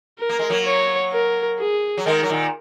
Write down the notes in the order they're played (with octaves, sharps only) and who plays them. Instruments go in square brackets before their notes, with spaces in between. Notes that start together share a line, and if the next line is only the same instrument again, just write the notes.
[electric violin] A#4
[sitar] A#3
G#3
F#3 A#3
[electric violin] C#5
A#4
G#4
[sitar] F#3
[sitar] D#3 G#3 [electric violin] A#4
[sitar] F#3
A#2 D#3